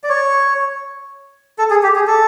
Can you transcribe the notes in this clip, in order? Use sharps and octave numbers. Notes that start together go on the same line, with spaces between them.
D5
C#5
A4
G#4
G4
G#4
A4